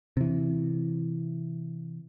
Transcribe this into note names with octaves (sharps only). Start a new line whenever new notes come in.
C3 E3